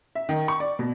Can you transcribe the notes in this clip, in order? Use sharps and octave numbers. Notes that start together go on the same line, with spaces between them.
E5
D#3
C#6
D5
B2